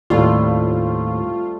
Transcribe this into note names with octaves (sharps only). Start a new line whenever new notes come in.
D#2 A2 G3 A3 C4 F4